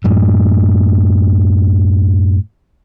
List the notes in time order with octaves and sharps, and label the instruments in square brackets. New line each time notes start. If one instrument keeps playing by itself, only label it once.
[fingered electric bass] F#2 A2